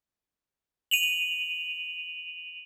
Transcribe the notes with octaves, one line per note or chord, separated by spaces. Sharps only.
D#7 F7 F#7